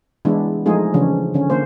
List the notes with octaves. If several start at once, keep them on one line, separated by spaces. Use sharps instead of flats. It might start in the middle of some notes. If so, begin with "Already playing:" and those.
E3 G#3 B3 D4 E4
F3 G#3 A3 D#4 F4 G#4
C#3 E3 F3 C#4 D4
D3 C#4
D3 A#3 C5